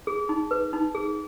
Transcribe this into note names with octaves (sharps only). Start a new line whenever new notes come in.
G#4
D#4
B4
D#4
G#4